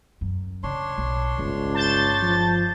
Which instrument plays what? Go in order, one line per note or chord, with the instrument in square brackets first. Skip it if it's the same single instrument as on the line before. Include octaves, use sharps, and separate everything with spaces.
[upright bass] F#2
[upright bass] C#3 [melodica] D4 C#5 C6
[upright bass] B1
[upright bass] G1 [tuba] C#2
[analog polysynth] A5 G6 A6
[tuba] F3